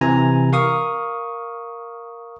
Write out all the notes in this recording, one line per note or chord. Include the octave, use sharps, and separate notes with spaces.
C3 E3 G#5 A#5
A#4 F5 C#6 D#6